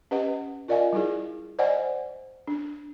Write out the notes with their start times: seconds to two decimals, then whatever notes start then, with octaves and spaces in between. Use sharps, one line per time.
0.11 C#4 G4 B4 D#5 F#5
0.68 F4 A#4 D5 D#5 F5 G#5
0.93 G3 D#4 E4 G#4
1.59 C5 D5 D#5 F#5 G#5
2.47 D4